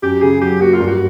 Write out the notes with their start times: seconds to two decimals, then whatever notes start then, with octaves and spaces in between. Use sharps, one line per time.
0.02 F#2 G4
0.22 C#3 G#4
0.41 F#3 G4
0.60 A#3 F#4
0.74 F4
0.80 G2
0.87 F#4